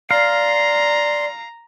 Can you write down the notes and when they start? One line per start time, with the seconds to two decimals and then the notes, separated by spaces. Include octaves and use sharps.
0.11 D5 F5 A#5 C6